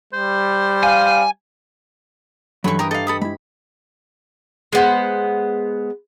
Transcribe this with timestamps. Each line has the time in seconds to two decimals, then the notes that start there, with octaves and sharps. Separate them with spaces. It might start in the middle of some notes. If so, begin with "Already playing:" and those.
0.13 G3 C5
0.83 F5 G#5
2.64 G2 E3 F#3 A4 B5 C#6
2.79 G4 A#4 A#5 D#6
2.91 A4 D#5 F5
3.07 A4 B5 D#6
3.21 G#3 E4 B5
4.73 G#3 B3 C5